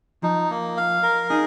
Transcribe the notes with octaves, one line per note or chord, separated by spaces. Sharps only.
F3 D#4
A#3
F5
A#4
D#4 G#4